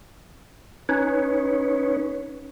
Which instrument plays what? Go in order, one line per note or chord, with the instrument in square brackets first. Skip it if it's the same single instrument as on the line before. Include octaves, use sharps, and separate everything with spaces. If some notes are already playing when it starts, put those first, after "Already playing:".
[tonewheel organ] C#4 D#4 B4 C#5